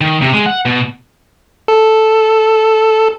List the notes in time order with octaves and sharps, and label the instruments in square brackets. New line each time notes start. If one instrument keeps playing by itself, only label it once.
[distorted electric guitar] D#3
C3
G#3
F#5
B2
[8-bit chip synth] A4